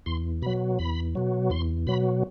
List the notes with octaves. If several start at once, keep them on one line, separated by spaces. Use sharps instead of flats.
E2 C6
B2 F#3 B5
E2 B5
B2 F#3
E2 C6
B2 F#3 B5